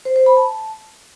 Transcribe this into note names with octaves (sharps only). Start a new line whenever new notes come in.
C5
C5
B5
A5